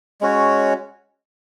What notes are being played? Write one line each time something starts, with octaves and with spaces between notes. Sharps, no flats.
G#3 C#4 F#4 C#5